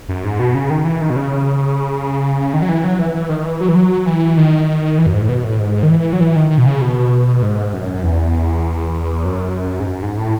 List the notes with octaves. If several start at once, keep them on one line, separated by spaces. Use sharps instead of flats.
F#2
G#2
B2
C#3
D#3
E3
D#3
B2
C#3
D#3
F#3
E3
F#3
E3
E3
D#3
E3
F#3
E3
F#3
E3
D#3
E3
F#2
G#2
A2
B2
A2
G#2
D#3
E3
F#3
E3
D#3
D#3
B2
C#3
B2
G#2
F#2
E2
F#2
G#2
F#2
G#2
A2